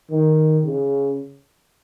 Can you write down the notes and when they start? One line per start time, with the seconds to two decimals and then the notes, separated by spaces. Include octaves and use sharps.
0.11 D#3
0.65 C#3